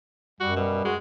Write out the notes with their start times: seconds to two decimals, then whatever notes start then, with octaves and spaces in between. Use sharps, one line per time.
0.40 F#2 G3 F#4
0.56 B2 G3
0.85 G#3 F#4